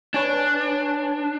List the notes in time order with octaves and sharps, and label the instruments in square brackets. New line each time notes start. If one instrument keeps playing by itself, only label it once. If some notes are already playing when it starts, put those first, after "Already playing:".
[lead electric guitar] D4 [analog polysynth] B4 C#5 G#5